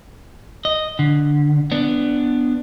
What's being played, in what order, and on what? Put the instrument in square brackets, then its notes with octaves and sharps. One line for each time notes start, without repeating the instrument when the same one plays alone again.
[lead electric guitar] D#5
D3
B3 D4